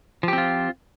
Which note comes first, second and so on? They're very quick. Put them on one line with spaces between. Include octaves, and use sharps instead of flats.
F3 G4 C4 F4